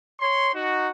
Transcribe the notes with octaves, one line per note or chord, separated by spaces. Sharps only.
C#5 C6
D#4 F#4